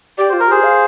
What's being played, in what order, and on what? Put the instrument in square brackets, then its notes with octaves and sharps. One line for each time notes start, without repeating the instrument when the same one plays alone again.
[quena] G4 [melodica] D5
[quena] F4 [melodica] C5
[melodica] A#4
[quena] G4 [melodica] G#4 C5
[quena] F5